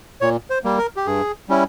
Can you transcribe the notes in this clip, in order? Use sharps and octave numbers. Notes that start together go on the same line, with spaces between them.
A#2 C#5
C5
G3 A#3
A#4
G4
G2 G#4
G3 C#4 E4